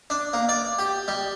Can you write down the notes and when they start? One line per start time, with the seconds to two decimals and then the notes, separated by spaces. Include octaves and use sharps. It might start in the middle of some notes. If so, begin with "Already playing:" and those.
0.10 D4
0.33 A#3
0.49 D5
0.79 G4
1.08 G3